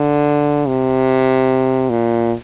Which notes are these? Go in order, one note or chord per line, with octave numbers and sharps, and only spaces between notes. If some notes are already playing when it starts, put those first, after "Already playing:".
Already playing: D3
C3
A#2